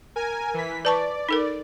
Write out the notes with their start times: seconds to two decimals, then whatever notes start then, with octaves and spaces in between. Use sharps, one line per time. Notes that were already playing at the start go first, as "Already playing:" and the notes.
0.16 A#4 G#5
0.54 E3 B6
0.85 B4 D5 A5 C#6
1.29 D#4 A4 A#4